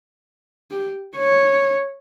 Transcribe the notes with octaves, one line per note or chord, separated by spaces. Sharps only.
G4
C#5